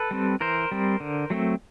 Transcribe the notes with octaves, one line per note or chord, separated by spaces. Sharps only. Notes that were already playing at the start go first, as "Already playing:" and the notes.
Already playing: A4 B4
G3 C4
E3 A#4 C5
G3 C4
D3
F#3 A3 C4